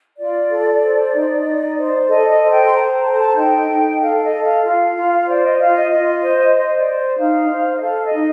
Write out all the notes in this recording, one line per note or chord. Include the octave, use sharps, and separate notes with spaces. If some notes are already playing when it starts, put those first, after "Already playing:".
F4 D5
A4
C5
D#4
D#4
C5
A4 D#5
D#5
C5
G5
C6
C5 A#5
A4 A5
A#5
A5
D#4 G5
D#4
A4 F5
D#5
A4
F5
F4 F5
F4
C5 D5
D#5
F4 F5
D#5
F4 D#5
C5
C5 D#5
D5
C5
D#4 F5
C5
D#5
A4 F5
D#5
D#4